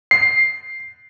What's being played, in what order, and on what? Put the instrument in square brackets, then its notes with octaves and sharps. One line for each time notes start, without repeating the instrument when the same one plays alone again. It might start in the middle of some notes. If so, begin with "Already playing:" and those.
[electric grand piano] C7